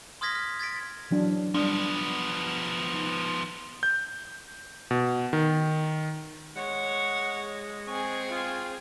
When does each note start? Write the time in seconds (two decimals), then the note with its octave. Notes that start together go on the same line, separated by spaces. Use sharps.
0.21 C6 D#6 F6 G#6 A#6 B6
0.35 F6
0.59 G#6 A6 B6 D7
1.11 E3 F#3 D4
1.54 F3 G3 B3 D4
2.94 D#4
3.83 G6
4.91 B2
5.33 D#3
6.56 G#3 C#5 F#5
7.87 C4 G#4 G#5 C#6
8.29 F4